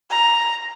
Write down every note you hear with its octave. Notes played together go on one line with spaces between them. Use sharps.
A#5